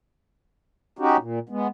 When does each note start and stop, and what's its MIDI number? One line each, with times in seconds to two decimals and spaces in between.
0.99 1.17 61
0.99 1.17 63
0.99 1.17 66
0.99 1.17 67
1.19 1.39 46
1.49 1.68 56
1.49 1.68 59